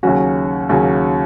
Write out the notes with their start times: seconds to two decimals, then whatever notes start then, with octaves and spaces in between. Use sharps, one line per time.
0.03 D#2 C#3 F#3 C#4 F#4
0.69 D#2 C#3 F#3 C#4